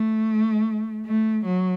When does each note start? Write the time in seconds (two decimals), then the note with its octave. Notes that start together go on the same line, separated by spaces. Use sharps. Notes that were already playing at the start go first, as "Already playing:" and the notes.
Already playing: A3
1.05 A3
1.45 F#3